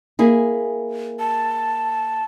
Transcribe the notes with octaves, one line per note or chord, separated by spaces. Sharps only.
A#3 E4 G#4
A5